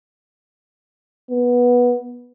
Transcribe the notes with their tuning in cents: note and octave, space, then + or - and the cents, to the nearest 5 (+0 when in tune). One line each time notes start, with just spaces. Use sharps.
B3 -15